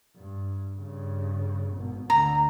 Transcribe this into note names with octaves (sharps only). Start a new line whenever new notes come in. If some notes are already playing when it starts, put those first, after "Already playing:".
G2
G2 C#3
G#1 B2
D2 D3 A#5